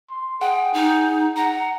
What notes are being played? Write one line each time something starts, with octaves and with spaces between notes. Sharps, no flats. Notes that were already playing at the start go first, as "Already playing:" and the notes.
C6
G#4 F#5 G5
D#4
F#5 A#5